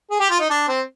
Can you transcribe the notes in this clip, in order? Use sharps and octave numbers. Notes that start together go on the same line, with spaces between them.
G#4
G4
F4
D#4
D4
C4